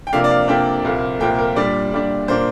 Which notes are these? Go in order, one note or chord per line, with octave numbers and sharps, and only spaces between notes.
G5
C3 F3 A#3 D4 F5
D5
F5
C3 F3 A#3 D4 G5
C2 A#2 F3 A#3
C2 A#2 F3 A#3 G5
A#4
A#2 G3 D4 D5
A#2 G3 D4
A#2 A#3 D4 C5